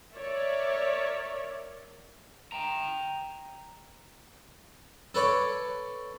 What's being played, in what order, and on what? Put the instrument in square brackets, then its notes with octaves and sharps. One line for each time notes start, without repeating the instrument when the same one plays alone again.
[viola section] A#4 C#5 D5 E5
[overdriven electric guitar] G5 A#5
[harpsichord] A4 B4 C#5 D5